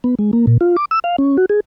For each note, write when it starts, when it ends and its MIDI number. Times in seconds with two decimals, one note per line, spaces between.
0.04 0.15 59
0.19 0.31 56
0.33 0.46 58
0.47 0.57 46
0.61 0.76 65
0.76 0.85 86
0.91 0.99 88
1.04 1.16 77
1.18 1.37 61
1.37 1.46 66
1.49 1.60 68